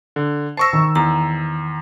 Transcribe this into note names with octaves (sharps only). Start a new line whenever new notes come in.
D3
C5 A5 C#6 E6 A#6
D#3
E2 A#5